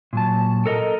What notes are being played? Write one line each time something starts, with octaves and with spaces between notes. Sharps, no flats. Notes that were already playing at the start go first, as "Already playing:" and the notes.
A#2 F#3 A5
A4 A#4 D#5